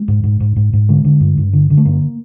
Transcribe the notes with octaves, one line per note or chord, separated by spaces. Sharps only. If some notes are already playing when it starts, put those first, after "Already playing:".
Already playing: G#3
G#2
G#2
G#2
G#2
G#2
D3 G#3
D3
G2
G2
D3
D3
A3
G2 A#3